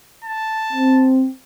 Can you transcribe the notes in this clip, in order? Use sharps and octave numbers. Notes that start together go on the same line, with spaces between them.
A5
C4